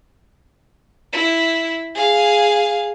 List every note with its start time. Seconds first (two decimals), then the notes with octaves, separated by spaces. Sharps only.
1.13 E4
1.95 G#4 F5